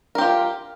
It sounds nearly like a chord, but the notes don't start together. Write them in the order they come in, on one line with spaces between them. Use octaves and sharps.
A#4 G4 F4